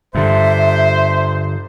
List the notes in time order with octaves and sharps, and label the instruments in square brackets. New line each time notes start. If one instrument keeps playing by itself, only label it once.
[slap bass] G2 D3 [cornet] C5 [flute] E5